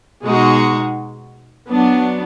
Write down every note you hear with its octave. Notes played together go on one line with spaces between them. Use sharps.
B2 G#3 D#4 F#4
F#3 B3 D4